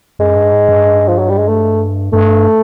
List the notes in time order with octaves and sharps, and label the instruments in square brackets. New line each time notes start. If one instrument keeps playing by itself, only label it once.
[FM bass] F#2 [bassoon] G#3
[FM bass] G2
G#2
G2
[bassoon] F3
F#3
G3
G#3
A3
[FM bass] G2 [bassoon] A3